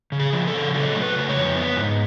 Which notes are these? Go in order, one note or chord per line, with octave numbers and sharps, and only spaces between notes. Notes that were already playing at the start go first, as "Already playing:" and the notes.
C#3
G#4
F3
A4
C#3
F#3 A4
A3
B4
C#3
C#5
F2
B3
G#2